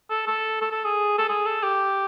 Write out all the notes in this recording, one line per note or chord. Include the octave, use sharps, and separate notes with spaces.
A4
A4
A4
A4
G#4
A4
G#4
A4
G4